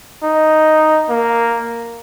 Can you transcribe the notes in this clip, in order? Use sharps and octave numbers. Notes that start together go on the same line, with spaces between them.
D#4
A#3